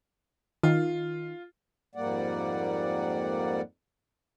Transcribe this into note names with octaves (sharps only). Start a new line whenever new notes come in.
D#3 F4
F2 G#2 G3 A#3 D5 F#5